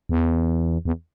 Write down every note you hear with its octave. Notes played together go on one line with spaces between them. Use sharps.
E2
E2